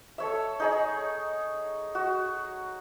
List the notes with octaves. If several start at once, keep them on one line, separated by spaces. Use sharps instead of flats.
A4 C#5 E5
D#4 G#4 C#5
F#4